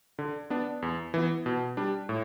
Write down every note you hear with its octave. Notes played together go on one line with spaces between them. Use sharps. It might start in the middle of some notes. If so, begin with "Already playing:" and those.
D3
B3 D4
E2
E3 B3
B2
G3 D4
A2